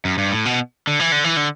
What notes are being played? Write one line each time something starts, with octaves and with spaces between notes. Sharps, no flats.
F#2
G2
A2
B2
D3
E3
D3
E3
D3